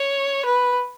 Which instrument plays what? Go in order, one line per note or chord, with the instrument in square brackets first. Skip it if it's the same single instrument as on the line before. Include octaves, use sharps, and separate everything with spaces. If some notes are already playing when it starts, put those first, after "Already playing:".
Already playing: [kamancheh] C#5
B4